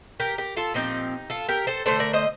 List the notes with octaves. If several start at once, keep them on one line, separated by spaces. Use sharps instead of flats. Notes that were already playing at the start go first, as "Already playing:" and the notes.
G4 A#4
G4 A#4
F4 A4
A#2 F3 C4 D#4 G4
F4 A4
G4 A#4
A4 C5
D3 A3 D4 A4 C5
A#4 D5
C5 D#5